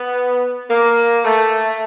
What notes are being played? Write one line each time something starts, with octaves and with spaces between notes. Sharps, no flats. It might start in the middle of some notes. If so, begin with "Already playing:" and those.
Already playing: B3
A#3
A3